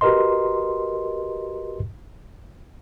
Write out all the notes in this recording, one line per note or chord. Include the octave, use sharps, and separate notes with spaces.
F#4 G4 A#4 B4 D#5 C6